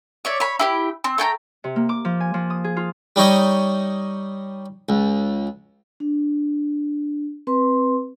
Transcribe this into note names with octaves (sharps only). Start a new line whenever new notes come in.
C#5 D5 E5
C#5 B5
E4 G4 G5
C4
A3 G5 G#5 A#5
C3
A#3
D6
F3
G#5
F3
D#6
G#4
F4
G3 D#4 C#5 D#5
C#2
D4
C4 B4 C6